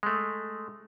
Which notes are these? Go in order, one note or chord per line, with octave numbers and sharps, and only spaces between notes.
G#3 A3